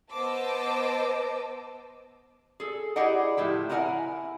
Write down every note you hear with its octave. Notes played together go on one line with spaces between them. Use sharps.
B3 C5 D#5 A5 D6 E6
G#4 A4
E4 G4 G#4 D5 D#5 F#5
A2 F3 E4 G4
E4 A#4 B4 D#5 F#5 G#5